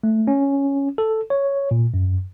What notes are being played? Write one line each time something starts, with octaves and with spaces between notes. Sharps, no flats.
A3
C#4
A4
C#5
A#2
F#2